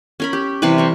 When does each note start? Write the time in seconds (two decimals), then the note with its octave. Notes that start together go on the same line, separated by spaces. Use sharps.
0.20 C#4 A#4 B5
0.33 G4
0.62 C3 E3 G3 B4
0.78 A#4 C#6